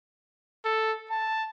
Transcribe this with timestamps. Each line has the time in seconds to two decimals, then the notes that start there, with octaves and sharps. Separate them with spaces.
0.65 A4
1.10 A5